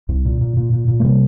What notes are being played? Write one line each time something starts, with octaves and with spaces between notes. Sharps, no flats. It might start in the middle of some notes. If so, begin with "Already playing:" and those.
C2
A#2
A#2
A#2
A#2
A#2
A3
C3 G3 A#3